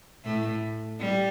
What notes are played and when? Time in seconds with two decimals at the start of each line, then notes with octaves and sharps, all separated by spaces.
0.24 A2 A3
1.00 G3